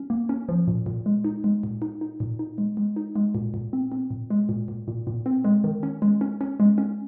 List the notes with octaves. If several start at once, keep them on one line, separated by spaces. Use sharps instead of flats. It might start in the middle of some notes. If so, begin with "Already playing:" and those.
Already playing: C#4
A#3
C#4
F3
A#2
A#2
G#3
D#4
G#3
A#2
D#4
D#4
A#2
D#4
G#3
G#3
D#4
G#3
A#2
A#2
C4
C4
A#2
G#3
A#2
A#2
A#2
A#2
C4
G#3
D#3
C#4
G#3
C#4
C#4
G#3
C#4